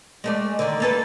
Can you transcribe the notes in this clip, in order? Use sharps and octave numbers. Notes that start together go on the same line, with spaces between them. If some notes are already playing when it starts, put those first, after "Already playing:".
G#3 A3 D5
D3 D#3
A#3 A4 B4